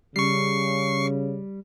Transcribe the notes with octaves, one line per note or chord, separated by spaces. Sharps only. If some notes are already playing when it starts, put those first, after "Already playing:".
C#3 G3 C#6 C7